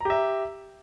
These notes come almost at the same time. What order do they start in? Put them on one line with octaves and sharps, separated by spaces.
A#5 G4 E5